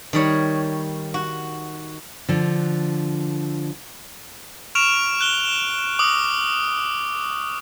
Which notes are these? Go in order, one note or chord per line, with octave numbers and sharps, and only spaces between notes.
D#3 G3 C#5
F#4
D3 F3
C#6 F6 D7 E7 F7
F#6 G7
D6 D#6